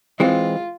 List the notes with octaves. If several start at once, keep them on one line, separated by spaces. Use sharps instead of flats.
E3 G#3 C4 F4